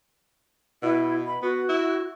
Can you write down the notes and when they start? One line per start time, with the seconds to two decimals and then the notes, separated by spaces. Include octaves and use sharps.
0.82 B2 E4
1.27 B5
1.42 B3 F#4
1.69 E4